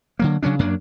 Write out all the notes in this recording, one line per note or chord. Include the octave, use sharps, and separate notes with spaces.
D3 F#3 A#3
C#3 F#3 C#4 D4
F#2 F#3 A#3 D4